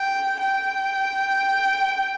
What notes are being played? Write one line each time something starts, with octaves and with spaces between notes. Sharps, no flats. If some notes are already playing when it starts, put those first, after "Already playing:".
Already playing: G5
G5